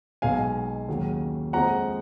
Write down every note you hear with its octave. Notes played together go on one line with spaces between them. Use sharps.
B1 B2 G#3 F5 G#5
D#2 C#3 F#3
F2 F3 G#3 F#5 A#5